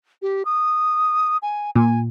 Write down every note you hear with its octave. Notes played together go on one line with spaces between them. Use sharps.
G4
D#6
G#5
A#2 G#5